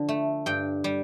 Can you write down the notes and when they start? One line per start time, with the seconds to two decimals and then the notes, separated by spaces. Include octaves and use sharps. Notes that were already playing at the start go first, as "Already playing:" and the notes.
Already playing: D3 F3
0.09 A3
0.46 G2 G5
0.84 G3